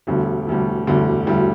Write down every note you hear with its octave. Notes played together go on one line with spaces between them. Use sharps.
E1 D2 D3 G3
E1 D2 D3 G3
E1 D2 D3 G3
E1 D2 D3 G3